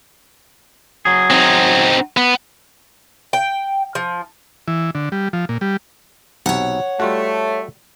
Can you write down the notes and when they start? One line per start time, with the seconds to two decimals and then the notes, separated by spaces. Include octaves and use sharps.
1.05 F#3 G#4
1.31 C4 D#4
2.17 B3
3.33 G5
3.95 F3
4.68 E3
4.95 D3
5.12 G3
5.33 F3
5.49 A#2
5.61 G3
6.46 B1 C3 C#5 F#5
7.00 G3 A3 F4 F#4